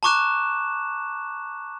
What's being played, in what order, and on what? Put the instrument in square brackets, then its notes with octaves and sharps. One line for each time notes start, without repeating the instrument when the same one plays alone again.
[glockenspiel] A5 A#5 C#6 D6 F#6 E7